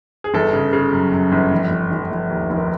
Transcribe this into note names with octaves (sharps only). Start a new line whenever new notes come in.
G#4
G1 A4
C#3
C#3
F#2
F#2
G1
F1
F1
F1
F1
D#2
F1
A#4